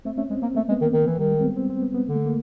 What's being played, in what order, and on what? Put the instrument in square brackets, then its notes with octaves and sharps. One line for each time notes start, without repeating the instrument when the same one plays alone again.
[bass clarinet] A3 [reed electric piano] C4
[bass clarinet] A3 [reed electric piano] C#4
[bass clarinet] G#3 [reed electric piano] C4
[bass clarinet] A#3 [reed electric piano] C4
[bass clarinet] A3 [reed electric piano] A#3
[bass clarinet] G#3
[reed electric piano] B3
[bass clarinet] D#3 [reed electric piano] A#3
[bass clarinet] D#3
E3
[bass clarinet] D#3 [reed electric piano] G3
[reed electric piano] G#3
C4
B3
C4
C4
B3
B3
[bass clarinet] D3 [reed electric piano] A#3
[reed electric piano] A3
A#3